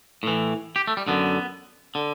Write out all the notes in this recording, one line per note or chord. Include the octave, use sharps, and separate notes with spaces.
A2 E3
G4
A3
G3
F#2 D3 B3
D3